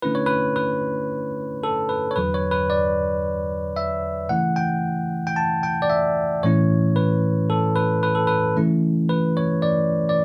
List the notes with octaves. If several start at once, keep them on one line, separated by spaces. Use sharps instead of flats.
D3 A3 C#4 E4 B4
C#5
B4
B4
A4
B4
C#5
E2 D3 F#3 B4
C#5
B4
D5
E5
C#3 E3 A3 E4 F#5
G5
G5
A5
G5
D5
E5
A2 E3 A3 C#4 E4 C#5
B4
A4
B4
B4
A4
B4
C#3 E3 A3 C#4 E4
B4
C#5
D5
D5